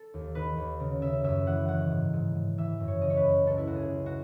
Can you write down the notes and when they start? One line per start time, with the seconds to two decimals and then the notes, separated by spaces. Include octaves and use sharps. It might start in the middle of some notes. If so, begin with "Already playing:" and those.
Already playing: A4
0.14 D#2
0.35 D#3 B4
0.57 D#2
0.80 C#3
1.02 C#3 E5
1.24 F#2 E5
1.46 E3 F#5
1.68 D#3 F#5
1.90 G#2
2.13 G#2
2.35 G#2
2.58 E3 E5
2.80 F#2
2.88 C#5
3.01 C#3 D#5
3.10 C#5
3.17 B4
3.24 F#2
3.46 C#2 A4
3.58 E4
3.67 C#2 F#4
3.76 G#4
3.90 C#2
4.06 F#4